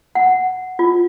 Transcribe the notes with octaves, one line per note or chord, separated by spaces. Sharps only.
F#5
F4